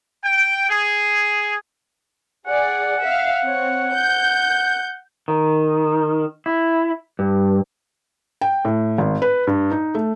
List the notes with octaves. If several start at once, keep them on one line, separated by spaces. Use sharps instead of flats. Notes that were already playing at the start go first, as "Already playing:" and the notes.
G5
G#4
G#4 D5 F#5
E5 F5
C4 C#5
G6
D#3
E4
G2
G5
A2
G#1
B4
G2
D#4
A3